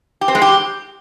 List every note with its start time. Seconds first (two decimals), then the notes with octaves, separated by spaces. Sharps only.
0.21 G4
0.28 C4
0.35 G#3
0.42 G4